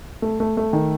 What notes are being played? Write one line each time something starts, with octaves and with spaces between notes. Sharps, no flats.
A3
A3
A3
D#3